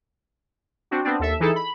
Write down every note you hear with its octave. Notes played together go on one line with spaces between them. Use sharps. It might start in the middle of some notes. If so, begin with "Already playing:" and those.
C4 D4 F#4
B3 C4 D4
D#2 A4 E5
E3 D#4 E4 G#4 A4
B5